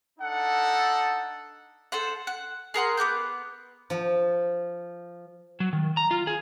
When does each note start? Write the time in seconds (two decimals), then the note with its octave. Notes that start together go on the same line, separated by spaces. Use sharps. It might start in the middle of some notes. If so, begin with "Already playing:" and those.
0.18 D4 D#4 A4 F#5
1.92 A4 C5 F#5
2.27 F#5
2.74 G#4 A#4 F#5 C6
2.97 B3 D6 F#6 G6
3.90 F3
5.60 F#3
5.73 D#3
5.97 A#5
6.11 F4
6.27 G#4